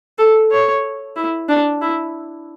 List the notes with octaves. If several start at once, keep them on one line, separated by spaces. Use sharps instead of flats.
A4
C#5
E4
D4
E4